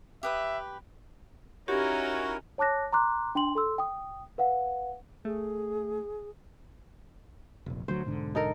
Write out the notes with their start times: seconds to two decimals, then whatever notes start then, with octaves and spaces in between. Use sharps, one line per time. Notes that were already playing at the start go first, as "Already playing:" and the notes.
0.23 G4 B4 E5 D#6
1.68 C#4 D#4 E4 F#4 G4 A#4 C#5
2.58 C#5 A5 D6 F#6 A#6
2.92 A#5 C6 D6 F#6
3.35 D4 G5 C6 F#7
3.55 A4 C6 E6
3.78 G5 D#6
4.38 B4 F5 F#5
5.25 A3 G#4
7.66 F1 A#1
7.88 D2 F#3 C5
8.05 B1 G#2 D3
8.35 D#4 A4 A#4